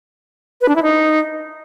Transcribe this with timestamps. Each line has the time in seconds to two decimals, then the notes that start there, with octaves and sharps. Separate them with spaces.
0.61 B4
0.68 D4
0.76 E4
0.83 D#4